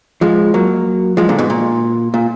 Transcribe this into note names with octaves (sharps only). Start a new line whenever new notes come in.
F3 G#3
F#3 A#3
F3 G#3
A#2 D3
G#2 B2
A#2
A#2